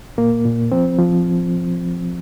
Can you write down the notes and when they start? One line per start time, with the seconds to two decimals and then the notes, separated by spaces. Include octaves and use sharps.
0.18 A#2 A#3
0.45 A#2
0.72 F3 C4
0.99 F3